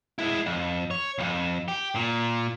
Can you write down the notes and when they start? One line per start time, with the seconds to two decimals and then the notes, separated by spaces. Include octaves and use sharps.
0.19 G#3 E4
0.46 F2
0.91 C#5
1.18 B1 F2
1.68 G4
1.96 A#2